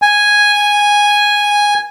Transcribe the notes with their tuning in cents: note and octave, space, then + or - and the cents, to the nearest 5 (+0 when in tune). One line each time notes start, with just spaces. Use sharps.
G#5 -5